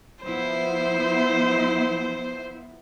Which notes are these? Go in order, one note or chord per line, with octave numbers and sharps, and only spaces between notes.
F3 B3 E4 C5